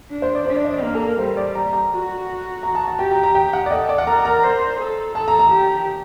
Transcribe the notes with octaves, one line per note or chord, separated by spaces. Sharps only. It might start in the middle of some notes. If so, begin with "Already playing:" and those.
D4
C5
D5
D4 C5
D5
D#5
D5
A#3 A#4
A4
A#4
G3 C5
D5
A#5
A#5
F#4
A#5
A5
A5
G4 G5
A#5
A#5
G5
F#5
D5
A4 D#5
D5
F#5
A#4 A#5
A#5
C5
A4
A4 A5
A#5
A#5
G4